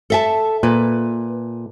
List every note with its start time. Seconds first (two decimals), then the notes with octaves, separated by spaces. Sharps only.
0.10 A4 E5 A5
0.63 A#2 B4